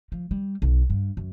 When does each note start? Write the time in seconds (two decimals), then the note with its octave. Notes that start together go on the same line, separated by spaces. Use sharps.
0.12 F3
0.31 G3
0.62 B1
0.90 G2
1.17 F#2